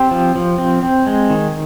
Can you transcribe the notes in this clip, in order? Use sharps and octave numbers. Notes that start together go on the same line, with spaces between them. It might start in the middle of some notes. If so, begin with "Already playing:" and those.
Already playing: C4 G4
F3
F3
C4
C4
G#3
D#3